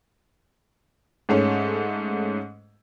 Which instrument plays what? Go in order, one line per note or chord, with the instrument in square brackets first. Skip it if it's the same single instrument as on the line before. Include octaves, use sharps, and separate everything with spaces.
[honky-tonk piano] G#2 A3 C#4